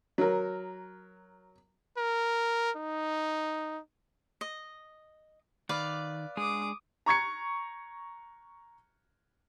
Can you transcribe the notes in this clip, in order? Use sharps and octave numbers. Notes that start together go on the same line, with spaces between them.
F#3 A#4
A#4
D#4
D#5
D#3 B4 D5 F5
G#3 D4 G#4 D6 D#6
A#5 C#6 G#6 C#7